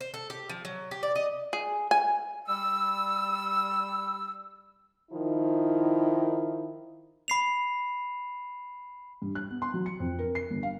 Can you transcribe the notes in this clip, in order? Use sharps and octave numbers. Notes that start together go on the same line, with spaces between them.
C5
A4
G4
F3
F#3
G4
D5
D#5
G#4
G#5
G3 E6
D#3 F3 D#4 E4
B5 C7 F7
G2
F#6
B3
C6
F#3
C#7
F2
A#4
C7
G1
F5